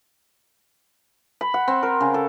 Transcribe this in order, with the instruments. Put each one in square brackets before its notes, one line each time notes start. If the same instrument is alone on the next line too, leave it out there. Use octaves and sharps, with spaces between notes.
[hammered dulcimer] B5
F#5
C4
A#4
C#3
A4